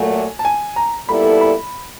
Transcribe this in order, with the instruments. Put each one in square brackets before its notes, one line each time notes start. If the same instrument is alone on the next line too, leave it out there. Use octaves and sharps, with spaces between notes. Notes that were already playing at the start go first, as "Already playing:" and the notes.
Already playing: [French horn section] A#2 F#3 A3 [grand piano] G#5
[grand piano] A5
G#5
A#5
[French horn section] A#2 G3 B3 E4 A4 [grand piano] B5
[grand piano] B5